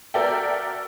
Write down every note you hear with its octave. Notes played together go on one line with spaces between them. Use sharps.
F#4 A4 A#4 D5 E5 G5